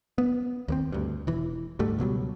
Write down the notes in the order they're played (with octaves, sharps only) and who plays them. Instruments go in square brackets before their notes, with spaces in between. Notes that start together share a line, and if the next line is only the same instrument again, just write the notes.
[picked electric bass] B3
D#2 A#3 C4
D2 G2
E1 E3
D2 G#2 G3 A3
C#2 B2 F#3 G3